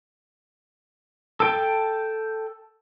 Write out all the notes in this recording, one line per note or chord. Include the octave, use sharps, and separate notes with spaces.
A4 G5 A5